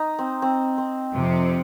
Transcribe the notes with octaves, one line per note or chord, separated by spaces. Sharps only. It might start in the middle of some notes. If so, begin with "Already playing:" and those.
Already playing: D#4
C4
C4
C4
F2 C3 F3